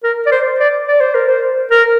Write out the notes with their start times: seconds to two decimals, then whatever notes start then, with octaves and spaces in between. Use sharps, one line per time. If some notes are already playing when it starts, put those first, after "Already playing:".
0.04 A#4
0.26 D5
0.32 C5
0.60 D5
0.87 D5
1.01 C5
1.15 A#4
1.28 C5
1.71 A#4